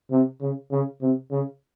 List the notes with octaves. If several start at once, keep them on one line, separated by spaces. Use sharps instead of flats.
C3
C#3
C#3
C3
C#3